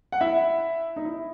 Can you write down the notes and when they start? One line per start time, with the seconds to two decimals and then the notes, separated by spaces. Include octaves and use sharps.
0.12 F#5
0.21 E4 E5
0.96 D#4
1.05 E4